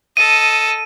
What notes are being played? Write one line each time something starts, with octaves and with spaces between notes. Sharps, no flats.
A4 D#5 D#7